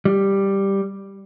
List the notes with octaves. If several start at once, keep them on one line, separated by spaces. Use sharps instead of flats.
G3